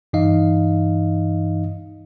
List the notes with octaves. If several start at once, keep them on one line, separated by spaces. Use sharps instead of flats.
G2 E3 D#4 D#5 F5